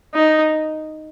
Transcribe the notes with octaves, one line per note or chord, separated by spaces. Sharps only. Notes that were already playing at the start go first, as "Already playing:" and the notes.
D#4